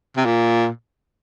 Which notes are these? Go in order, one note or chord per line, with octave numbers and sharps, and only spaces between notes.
C3
A#2